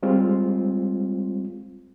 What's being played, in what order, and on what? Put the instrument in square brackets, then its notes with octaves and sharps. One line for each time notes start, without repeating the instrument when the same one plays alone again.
[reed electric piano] G3 G#3 C4 F4